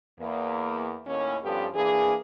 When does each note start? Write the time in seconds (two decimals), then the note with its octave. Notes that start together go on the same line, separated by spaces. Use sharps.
0.20 E2 A#3
1.07 D#2 A2 C#4
1.43 G2 F3 B3 C#4 G4 A4
1.74 E3 A#3 D4 G#4